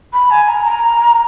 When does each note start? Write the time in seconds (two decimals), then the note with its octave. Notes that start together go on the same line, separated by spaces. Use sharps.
0.13 B5
0.31 G#5
0.49 A#5
0.66 A#5